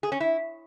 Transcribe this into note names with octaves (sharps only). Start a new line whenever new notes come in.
G#4
C#4
E4